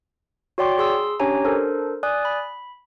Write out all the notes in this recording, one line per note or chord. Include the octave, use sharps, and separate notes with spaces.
F#4 C#5 D5 G5 C6 D6
G#4 C6 E6
C#4 D4 G4 C#5 G#5 A#5
D4 A4 A#4 C5
D5 G#5 D#6 F#6
B5